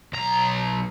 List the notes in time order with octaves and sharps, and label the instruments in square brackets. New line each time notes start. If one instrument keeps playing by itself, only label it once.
[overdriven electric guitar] B1 A#5